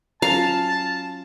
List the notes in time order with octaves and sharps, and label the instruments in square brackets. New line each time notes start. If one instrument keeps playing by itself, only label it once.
[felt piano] F#3 C#4 F4 [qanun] F5 [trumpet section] A5 [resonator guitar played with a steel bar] A#5